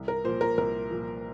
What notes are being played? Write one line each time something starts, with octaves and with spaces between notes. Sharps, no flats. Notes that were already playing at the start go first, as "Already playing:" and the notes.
Already playing: C2
A#4
A#2 F3 C5
A#4
C2 A#4
A#2 F3